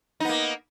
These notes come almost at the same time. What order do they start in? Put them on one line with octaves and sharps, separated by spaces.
D#4 B3 A#3